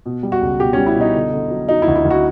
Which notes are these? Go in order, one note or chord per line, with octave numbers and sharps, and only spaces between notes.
B2
G3
F#4
C#2
B2 G4
G3 C#4
E4
B2
D#4
D3
D3
F#3
F#3 D#4
E4
D2
E4
D2
F#4